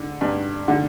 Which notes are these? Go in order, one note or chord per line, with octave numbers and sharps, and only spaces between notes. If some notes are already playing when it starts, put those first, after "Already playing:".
Already playing: D3
G2
D3